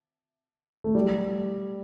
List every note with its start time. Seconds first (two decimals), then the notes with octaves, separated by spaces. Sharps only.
0.84 A3
0.95 G3